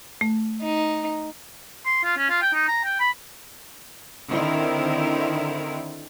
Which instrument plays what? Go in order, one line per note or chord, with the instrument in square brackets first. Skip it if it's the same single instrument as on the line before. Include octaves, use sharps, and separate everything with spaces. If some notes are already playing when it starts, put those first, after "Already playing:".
[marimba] A3
[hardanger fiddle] D#4
[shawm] C6
F4
C#4
F4
G5
D#4
A#5
G5
B5
[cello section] D3 D#3 C4 E4 A#4